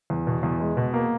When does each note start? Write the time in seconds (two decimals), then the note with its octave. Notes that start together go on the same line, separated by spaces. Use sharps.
0.10 E2
0.27 B2
0.43 E2
0.60 G#3
0.77 B2
0.93 A#3